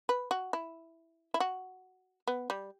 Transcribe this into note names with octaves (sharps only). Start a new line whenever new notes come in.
B4
F#4
E4
E4
F#4
B3
G3